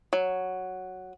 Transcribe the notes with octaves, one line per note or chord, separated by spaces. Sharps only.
F#3